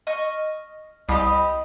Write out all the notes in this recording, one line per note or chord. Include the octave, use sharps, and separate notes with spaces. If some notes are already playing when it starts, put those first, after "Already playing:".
D#5 C#6 F6
C2 C4 G4 D#5 B5